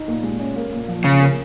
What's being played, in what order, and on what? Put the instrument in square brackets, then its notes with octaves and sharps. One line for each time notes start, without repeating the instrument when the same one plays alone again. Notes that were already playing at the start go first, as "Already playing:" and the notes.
Already playing: [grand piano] D#4
A#2
G#3
C#4
A#3
A#2
F3
[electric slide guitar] C#3 [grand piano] C#4
[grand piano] A#3